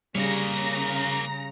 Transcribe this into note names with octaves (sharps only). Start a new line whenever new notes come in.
C#3 G3 A#3 C#5 A#5 A#6